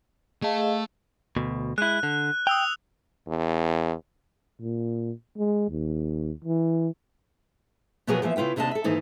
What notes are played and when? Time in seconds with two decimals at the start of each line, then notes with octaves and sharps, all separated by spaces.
0.42 A3 G#4 D#5 F5 A5
1.36 D2 B2
1.78 G#3 E4 F#6
2.03 D3
2.47 G5 D#6 E6 F7
3.28 E2
4.61 A#2
5.38 G#3
5.70 D#2
6.45 E3
8.07 B2 F3 F#3 B3 G#4 A#4
8.22 E3 F3 A#3 E5
8.36 C#3 E4 F4 B4 G5
8.56 D#2 C3 A#3 D4 D#5 A5
8.71 A4 E5
8.84 G#2 D#3 E3 A#3